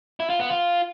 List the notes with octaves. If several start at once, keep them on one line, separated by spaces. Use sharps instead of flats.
E4
F4
B3
F4